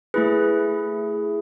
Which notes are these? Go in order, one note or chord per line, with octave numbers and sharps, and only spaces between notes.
A3 E4 G#4 B4